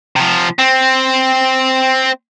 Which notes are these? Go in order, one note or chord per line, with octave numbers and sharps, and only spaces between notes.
C3 F3
C4